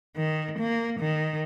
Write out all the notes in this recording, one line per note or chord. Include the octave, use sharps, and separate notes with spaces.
D#3
A#3
D#3